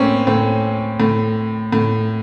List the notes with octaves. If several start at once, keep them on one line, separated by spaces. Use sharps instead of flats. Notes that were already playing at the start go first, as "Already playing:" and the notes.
Already playing: A2 A#3 C4 C#4
A2 C4
A2
A2